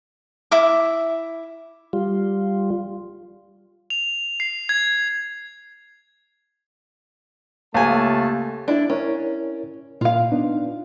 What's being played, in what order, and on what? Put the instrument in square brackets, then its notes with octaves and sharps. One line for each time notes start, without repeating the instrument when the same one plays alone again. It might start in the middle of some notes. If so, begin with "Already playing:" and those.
[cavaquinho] E4 E5 D6
[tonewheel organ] G3 F4
[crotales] F7
C7
G#6
[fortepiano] C#2 G#5 [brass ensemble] A3 A5 [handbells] A#3 G4
[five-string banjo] D4 E4
[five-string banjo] C#4 [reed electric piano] E4 A#4 C#5
[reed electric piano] A#2 [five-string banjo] F4 F5
[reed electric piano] B3 D4 D#4